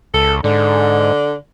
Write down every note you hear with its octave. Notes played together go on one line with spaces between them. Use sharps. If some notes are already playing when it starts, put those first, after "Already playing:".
C#2 A4
G#2 D3